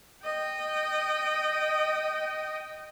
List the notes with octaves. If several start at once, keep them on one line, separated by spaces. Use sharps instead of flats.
D#5 G5